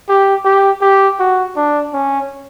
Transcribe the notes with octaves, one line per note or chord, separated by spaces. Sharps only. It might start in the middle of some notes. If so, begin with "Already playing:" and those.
G4
G4
G4
F#4
D4
C#4